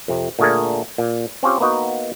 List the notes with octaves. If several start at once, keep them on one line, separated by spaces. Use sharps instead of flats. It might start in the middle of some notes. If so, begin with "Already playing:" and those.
F2 C3
A#2 D3 A3 G#4 A#4
A#2
C4 C#4 F4 G4
A#3 B3 D#4 F#4